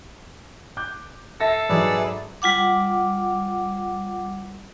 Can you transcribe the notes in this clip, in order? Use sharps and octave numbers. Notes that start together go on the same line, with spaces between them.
D6 F#6 G6
A4 E5 A5 A#6
G#2 F#3 G#4 B4 D5
G3 F4 F#5 D6